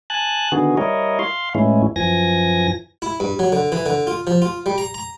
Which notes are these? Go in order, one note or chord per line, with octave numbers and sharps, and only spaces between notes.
G#5 A5 F#6
D3 D#3 B3 F#4 G#4
G3 E4 A#4 C#5 D#5
F5 C6
A2 E3 G#3 C#4 E4
F#2 E3 F3 G#5 A#6
E4
G2
F#3
D3
E3
D3
F4
F3
F4
G3
A#5
A#5